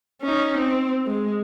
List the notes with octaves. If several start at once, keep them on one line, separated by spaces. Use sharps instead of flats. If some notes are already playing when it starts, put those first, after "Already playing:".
C#4 D#4
C4
G#3